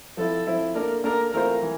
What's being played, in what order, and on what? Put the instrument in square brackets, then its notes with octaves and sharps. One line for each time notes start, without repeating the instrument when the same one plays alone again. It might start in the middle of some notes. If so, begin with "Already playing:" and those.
[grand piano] F3 C4 E4 [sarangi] A4
[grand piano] F3 C4 E4
[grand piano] A#3 D4 A4 D5 [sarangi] A#4
[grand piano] A#3 D4 A4 D5 [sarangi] A#4
[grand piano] E3 A3 C4 F4 C5 [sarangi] A#4
[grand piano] E3